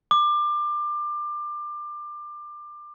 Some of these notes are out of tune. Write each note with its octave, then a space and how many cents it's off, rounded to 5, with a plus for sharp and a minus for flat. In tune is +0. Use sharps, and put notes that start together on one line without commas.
D6 +25